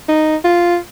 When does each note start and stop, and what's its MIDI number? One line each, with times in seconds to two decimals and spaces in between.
0.09 0.36 63
0.44 0.77 65